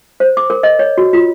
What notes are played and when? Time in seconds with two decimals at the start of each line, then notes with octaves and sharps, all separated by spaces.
0.20 C5
0.37 D6
0.50 A#4
0.63 D#5
0.79 C#5
0.98 F#4
1.13 F4